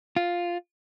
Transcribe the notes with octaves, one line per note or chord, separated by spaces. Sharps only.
F4